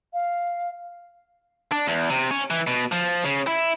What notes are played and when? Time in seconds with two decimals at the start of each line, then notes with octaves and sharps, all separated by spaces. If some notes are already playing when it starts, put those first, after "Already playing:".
0.13 F5
1.72 D4
1.88 E2
2.10 C3
2.31 C#4
2.50 E3
2.67 B2
2.92 F3
3.24 C#3
3.47 E4